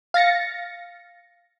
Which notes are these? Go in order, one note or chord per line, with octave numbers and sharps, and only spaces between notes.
F5 A6 A#6 C#7